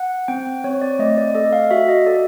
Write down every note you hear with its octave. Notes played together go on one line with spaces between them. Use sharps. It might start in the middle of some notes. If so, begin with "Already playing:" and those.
Already playing: F#5
C4 G5
C4 C#5
D5
A3 D#5
D5
A4 D#5
F5
F#4 E5
D#5
A4 D5